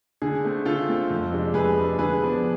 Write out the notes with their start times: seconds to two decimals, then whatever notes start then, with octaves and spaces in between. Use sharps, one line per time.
0.22 D3 G#4
0.44 A3 C4
0.65 D3 F4 A4
0.88 A3 C4
1.10 F2
1.32 C3 G#3 D4
1.54 F2 G#4 B4
1.76 C3 G#3 D4
1.99 D3 G#4 B4
2.21 F3 B3 D4